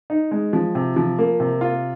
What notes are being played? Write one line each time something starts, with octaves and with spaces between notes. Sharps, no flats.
D#4
G#3
F3
C3
F3
A#3
C3
F4